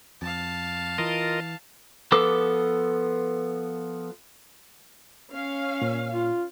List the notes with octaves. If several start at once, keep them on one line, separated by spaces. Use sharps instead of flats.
F2 F5 A5
E3 F4 A#4 D#5
F3 B3 A4 B4 D6
C#4 F5
A#2
F4